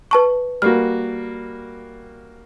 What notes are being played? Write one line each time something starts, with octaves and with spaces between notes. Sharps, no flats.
B4 A5 C#6
G3 A#3 F#4 F6